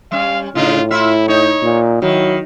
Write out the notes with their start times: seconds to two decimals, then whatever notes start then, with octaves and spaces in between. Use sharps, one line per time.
0.12 G3 C#4 F5
0.55 A2 C#3 D4 D#4 F4
0.91 E4 F4 E5
1.28 D#4 C#5
1.63 A#2
2.02 D#3 F#3 E4